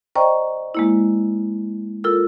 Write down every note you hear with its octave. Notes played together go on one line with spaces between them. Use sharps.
C5 D5 D#5 G5 A#5 C#6
G#3 A#3 E4
F4 A4 A#4 E6